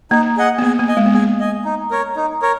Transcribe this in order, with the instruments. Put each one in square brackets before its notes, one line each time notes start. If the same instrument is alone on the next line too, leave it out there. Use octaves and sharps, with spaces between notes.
[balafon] A#3 [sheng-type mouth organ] D#4
[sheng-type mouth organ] G#4 D#5 F#5
[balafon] B3
[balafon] A#3 [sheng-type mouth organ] G#4
[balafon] A#3
[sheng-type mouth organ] D#5 G#5
[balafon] G#3
B3
[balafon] A#3 [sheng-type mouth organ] G#4
[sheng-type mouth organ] D#5 G#5
D#4
A#4 C#5
D#4
A#4 C#5